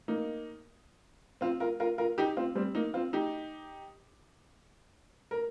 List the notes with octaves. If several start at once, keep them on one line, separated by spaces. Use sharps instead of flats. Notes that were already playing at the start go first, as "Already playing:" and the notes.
A#3 D#4
C4 F4
F4 A#4
F4 A#4
F4 A#4
D#4 G4
C4 F4
G3 C4
A#3 D#4
C4 F4
D#4 G4
A#4